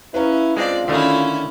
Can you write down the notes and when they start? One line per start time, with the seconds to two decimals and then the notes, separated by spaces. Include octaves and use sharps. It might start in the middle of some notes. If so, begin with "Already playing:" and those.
0.14 C#4 E4 B4 F5 A#5
0.57 G#3 C4 D4 F4 D5
0.88 D3 D#3 A3 C#4 D4 E4 A4 F5